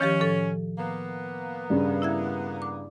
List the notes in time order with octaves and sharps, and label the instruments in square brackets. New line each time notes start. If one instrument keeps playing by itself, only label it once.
[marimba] D#3 F3 G4 [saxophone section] C#4
[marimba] A2 F3 A4
[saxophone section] A#3 B3
[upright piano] G2 C#3
[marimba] E4 E5 G#6
D6